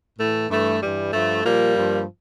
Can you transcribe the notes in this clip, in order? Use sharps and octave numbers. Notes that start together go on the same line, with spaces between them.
A2 E3 A3
G2 E3 A3
G2 E3 G3
G2 F3 A3
A#2 F3 G3 A#3
G2 F3